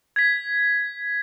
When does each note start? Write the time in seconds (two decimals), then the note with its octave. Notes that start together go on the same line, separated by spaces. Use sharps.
0.16 G#6 B6